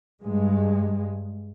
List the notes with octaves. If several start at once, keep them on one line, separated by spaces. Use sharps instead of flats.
G2 G#3